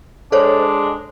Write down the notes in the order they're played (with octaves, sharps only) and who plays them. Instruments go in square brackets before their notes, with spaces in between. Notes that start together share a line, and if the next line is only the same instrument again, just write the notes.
[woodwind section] G#3 D4 [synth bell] A4 C5 C#5